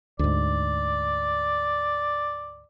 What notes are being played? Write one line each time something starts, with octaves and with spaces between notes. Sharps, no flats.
D2 G#2 D5